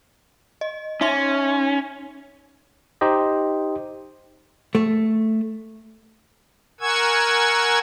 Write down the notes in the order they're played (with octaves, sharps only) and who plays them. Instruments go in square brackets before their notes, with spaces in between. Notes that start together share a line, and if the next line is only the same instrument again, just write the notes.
[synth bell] D#5
[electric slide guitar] C#4 [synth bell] D#4 E5 C6
[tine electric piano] D#4 G4 C5 D#5
[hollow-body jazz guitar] A3
[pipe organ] A#4 F#5 G#5 C#6 E6 G#6